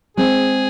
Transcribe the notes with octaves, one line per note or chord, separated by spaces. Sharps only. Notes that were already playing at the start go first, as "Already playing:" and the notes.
G#3 C4 G#4